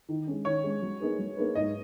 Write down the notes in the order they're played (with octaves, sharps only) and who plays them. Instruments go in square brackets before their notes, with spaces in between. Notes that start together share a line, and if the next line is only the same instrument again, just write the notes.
[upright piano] D#3
G#3 C#4
[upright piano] D#3 [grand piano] C#5
[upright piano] G#3 C#4
F#3
A#3 D#4 G#4 B4
F#3
A#3 D#4 G#4 B4
[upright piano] G#2 [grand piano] D#5